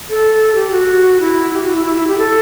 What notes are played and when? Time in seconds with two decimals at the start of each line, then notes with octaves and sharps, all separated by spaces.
0.10 A4
0.55 G4
0.71 F#4
1.20 E4
1.53 G4
1.63 F#4
1.75 E4
1.86 E4
1.96 E4
2.07 G4
2.18 A4